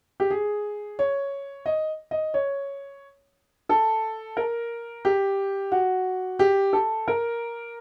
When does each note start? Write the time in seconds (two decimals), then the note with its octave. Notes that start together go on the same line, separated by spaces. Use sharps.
0.20 G4
0.30 G#4
0.99 C#5
1.66 D#5
2.11 D#5
2.34 C#5
3.69 A4
4.37 A#4
5.05 G4
5.72 F#4
6.39 G4
6.73 A4
7.08 A#4